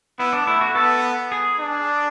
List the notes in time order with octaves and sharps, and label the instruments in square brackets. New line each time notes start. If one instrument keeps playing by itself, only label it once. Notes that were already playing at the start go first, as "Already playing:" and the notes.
[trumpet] B3 [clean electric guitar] E4
[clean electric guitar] D4
[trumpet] A3 [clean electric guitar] E4
[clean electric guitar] F#4
[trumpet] B3 [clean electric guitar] A4
[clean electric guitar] G#4
[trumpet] D4